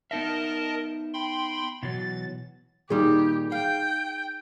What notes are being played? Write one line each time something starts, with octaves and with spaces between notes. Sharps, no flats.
B3 D#4 A#4 D#5 E5 A5
G5 B5 C6
B2 E3 F#3 A6
A#2 D#3 G3 D#4 G4 G#4
F5 G5